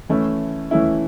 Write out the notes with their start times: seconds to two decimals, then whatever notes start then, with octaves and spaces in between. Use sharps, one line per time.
0.09 E3 A3 C#4 E4
0.71 E3 A3 C#4 E4